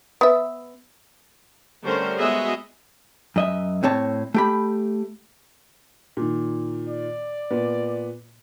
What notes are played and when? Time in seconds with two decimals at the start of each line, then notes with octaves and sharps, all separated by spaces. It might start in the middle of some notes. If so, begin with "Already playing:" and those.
0.21 B3 E5
1.84 D3 G3 A3 C#4 A#4 C5
2.17 G#3 B3 F#4 G#4 D#5 E5
3.36 F#2 D#5 E5
3.83 A2 C4 C#5 A5
4.34 A3 G4 B5
6.17 A#2 D#3
6.88 D5
7.51 A#2 B3